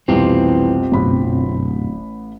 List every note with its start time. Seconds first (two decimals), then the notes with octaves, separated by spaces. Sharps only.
0.08 F1 C2 B2 E3 C4 F4 G4
0.92 D1 A1 F#2 B2 B5